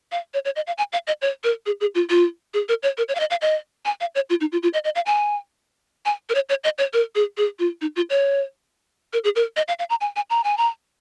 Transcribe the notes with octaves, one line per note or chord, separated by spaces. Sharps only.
F5
C#5
C#5
D#5
F5
G#5
F5
D#5
C#5
A#4
G#4
G#4
F4
F4
G#4
A#4
C#5
A#4
C#5
F5
D#5
F5
D#5
G#5
F5
C#5
F4
D#4
F4
F4
D#5
D#5
F5
G#5
G#5
A#4
C#5
C#5
D#5
C#5
A#4
G#4
G#4
F4
D#4
F4
C#5
A#4
G#4
A#4
D#5
F5
F5
A#5
G#5
G#5
A#5
G#5
A#5